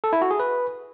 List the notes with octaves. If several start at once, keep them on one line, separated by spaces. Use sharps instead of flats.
A4
E4
F#4
G#4
B4